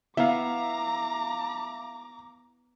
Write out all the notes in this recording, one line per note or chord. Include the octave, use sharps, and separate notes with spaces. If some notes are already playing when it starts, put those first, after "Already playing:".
B3 E4 E5 F5 A#5 D6